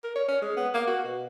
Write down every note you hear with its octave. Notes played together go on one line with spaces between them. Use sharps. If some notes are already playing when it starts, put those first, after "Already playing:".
A#4
C#5
C#4
G#3
B3
A#3
F#4
B2